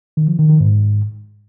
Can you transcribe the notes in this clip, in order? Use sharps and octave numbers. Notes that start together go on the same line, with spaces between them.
D#3
F3
D#3
D#3
G#2